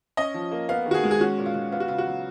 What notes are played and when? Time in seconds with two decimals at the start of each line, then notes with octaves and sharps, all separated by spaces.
0.17 C#4 D#5
0.34 F3
0.52 A#3
0.69 B3 F5
0.86 D#3
0.91 F#4
0.94 G#4
1.04 G#3
1.11 G#4
1.21 C#4 F#4
1.38 A#2
1.46 F4
1.55 G#3
1.72 B3 F4
1.80 F#4
1.88 C#3 F4
1.98 F#4
2.07 F#3